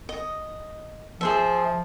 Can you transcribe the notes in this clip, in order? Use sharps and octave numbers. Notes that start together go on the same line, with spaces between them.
D#5
F3 G#4 C5 E5